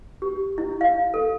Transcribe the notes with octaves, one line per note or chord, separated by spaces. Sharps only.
G4
E4
F5
A4